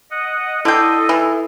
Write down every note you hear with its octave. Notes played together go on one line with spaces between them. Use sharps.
D#5 F#5
D3 E4 A4 D#5 G5 D#6 C7
E3